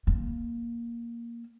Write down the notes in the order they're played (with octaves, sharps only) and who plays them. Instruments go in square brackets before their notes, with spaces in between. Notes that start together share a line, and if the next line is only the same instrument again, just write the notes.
[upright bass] A#3